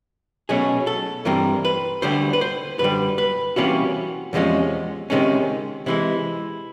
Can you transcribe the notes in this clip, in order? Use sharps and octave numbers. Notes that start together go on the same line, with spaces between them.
B2 F#3 A3 C#4 G#4
A4
G2 E3 G3 C4 A#4
B4
D2 D3 G3 C5
B4
C5
F#2 D3 G3 B4
B4
C3 E3 G3 A#3 C#4 F#4
E2 C3 F3 G#3 C#4
C#2 C3 D#3 G#3 C#4
C3 E3 G#3 E4